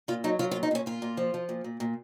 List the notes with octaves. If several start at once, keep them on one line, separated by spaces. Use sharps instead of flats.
A#2 F4
F#3 D#4
F#3 F4
F4
A#2
D#4
A#2 C#4
A#2 F4
A#2
F3
F3
A#2
A#2
A#2